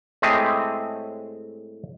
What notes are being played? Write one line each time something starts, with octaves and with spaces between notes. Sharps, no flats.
A2 G#3 A3 C4 G4 G#4